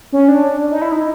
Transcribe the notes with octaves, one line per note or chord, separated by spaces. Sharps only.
C#4
D4
D#4
E4
D#4